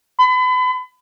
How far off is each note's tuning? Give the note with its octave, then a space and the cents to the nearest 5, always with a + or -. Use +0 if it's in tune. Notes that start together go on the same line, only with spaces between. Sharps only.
B5 +35